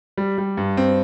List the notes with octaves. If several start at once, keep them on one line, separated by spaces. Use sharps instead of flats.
G3
G3
G2
C4